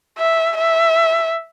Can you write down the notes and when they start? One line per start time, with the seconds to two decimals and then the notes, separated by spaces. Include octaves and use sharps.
0.19 E5
0.58 E5